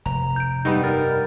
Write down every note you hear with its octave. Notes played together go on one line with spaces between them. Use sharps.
F1 A#5
G6 D7
G2 G3 B3 D#4
A#4 F6 A6